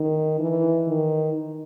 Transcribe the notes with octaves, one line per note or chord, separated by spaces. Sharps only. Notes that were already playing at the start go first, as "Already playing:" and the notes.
Already playing: D#3
E3
D#3